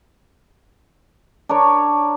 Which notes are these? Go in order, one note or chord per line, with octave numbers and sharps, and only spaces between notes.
D4 A#4 C#5